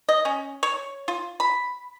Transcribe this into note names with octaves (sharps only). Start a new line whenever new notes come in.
D#5
C#4
C#5
F4
B5